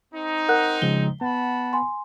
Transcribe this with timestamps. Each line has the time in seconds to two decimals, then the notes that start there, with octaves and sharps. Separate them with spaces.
0.14 C4 D#4
0.49 A#4 F#5 F#6
0.82 C#3 F3 G#3 G7
1.21 B3 F#5 A5 B5
1.73 G#5 C6